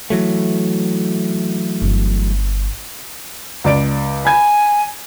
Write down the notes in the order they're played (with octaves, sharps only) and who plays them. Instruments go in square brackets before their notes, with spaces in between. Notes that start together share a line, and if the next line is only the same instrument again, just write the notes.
[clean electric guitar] E3 F#3 A3
[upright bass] G1
[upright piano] C#2 D5 D7
[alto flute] G#5 [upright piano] B5 G#6